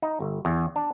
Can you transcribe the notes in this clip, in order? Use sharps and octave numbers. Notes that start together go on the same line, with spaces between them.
D#4
G1
E2
D4